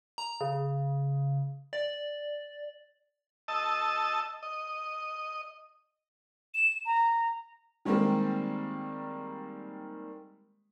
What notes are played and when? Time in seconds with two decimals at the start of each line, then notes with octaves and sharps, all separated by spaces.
0.18 A#5
0.41 C#3
1.73 D5
3.48 D#5 A5 E6
4.43 D#5
6.54 E7
6.86 A#5
7.85 D#3 G3 G#3 A#3 C4